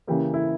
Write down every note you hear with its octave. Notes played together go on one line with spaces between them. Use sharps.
C#3 E3 A#3 G4
E4